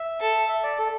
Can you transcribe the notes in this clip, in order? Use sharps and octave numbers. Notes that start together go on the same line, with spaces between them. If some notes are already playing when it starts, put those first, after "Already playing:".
Already playing: E5
A4
E5
D5
A4